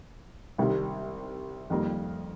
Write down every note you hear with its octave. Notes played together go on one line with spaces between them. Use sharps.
C2 C3 D#3 G3
F2 D#3 G3 A#3